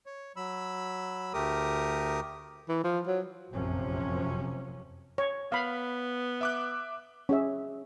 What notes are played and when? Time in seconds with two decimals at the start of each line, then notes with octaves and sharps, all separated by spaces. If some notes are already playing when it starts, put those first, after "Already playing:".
0.06 C#5
0.36 F#3 B5 E6
1.33 D2 A3 G4 A#4 D#6
2.69 E3
2.84 F3
3.07 F#3
3.51 F1 A#1 F#2 C3 F3 C#4
5.18 C#5
5.52 B3 F5 B5
6.41 E5 D6 F#6
7.29 C#4 G#4 E5